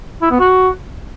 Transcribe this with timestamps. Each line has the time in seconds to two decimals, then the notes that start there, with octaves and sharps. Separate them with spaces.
0.21 E4
0.30 B3
0.39 F#4